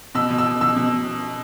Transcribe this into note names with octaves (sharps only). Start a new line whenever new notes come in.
B2 E6
B2
E6
B2
B2 E6
B2